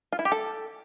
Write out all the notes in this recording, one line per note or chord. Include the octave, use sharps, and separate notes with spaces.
F4
E4
G4
A4